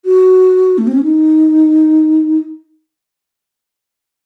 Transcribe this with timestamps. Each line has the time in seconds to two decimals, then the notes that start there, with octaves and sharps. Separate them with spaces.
0.05 F#4
0.78 A3
0.87 C4
0.95 C#4
1.03 D#4